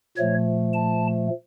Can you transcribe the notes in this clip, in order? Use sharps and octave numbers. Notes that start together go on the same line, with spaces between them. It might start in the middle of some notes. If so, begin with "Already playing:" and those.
A#2 F3 A3 C#5
A5